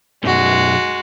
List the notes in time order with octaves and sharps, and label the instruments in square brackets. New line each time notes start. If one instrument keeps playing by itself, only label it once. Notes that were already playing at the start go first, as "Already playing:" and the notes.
[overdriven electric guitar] B1 F#2 [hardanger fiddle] G#3 F#4